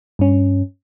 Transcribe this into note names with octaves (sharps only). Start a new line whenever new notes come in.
G2 C#4